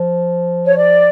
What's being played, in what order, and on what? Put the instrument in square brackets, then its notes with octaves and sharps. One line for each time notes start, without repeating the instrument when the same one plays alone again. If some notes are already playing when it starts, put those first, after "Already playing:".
Already playing: [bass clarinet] F3
[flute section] C#5
D5